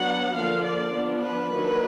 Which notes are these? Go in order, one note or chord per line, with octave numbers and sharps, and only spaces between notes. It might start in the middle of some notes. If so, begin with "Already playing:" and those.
Already playing: F#3 B3 D4 F#5
D3 F3 A#3 D4 F5
D5
F3 B3 D4
B4
D#3 F#3 A#3 D4